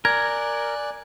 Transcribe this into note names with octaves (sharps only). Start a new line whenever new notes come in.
A#4 D5 G#5 F#6 G#6